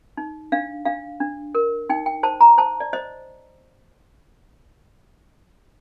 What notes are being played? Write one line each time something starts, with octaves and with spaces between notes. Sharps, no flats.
D#4
D4 F5
D4 F5
D4
A#4
D#4 G5
G5
C5 A5
A#5
C5 A5
D5
C5 D#5